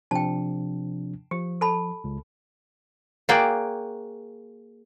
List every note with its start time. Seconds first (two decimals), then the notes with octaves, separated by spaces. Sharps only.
0.11 C3 F3 D4 G5 A5
1.31 F3 G4
1.61 A4 A5 B5
2.04 C#2
3.29 A#3 F#4 G#4 D5 G5